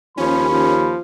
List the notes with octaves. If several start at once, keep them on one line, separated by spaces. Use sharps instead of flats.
D#2 F3 C#4 B5
F3